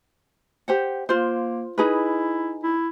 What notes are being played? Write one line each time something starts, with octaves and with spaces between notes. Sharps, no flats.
G4 C5 F#5
A#3 F4 C5
D#4 E4 G#4 B4
E4